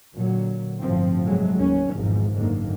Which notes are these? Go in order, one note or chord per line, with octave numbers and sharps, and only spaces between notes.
A#2 D3 F#3
G1 A2 F3 C4
A2 C3 F#3 G#3 A3
F#1 D#2 C#4
G#1 E2 G#2 B2 F3
F#1 D2 G#2 D3 D#3 A#3